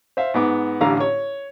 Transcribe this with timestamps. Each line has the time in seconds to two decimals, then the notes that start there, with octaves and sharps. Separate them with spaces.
0.17 C5 E5 F5
0.34 G#2 B3 D6
0.81 A1 D3 G4 F5 A#5
1.00 C#5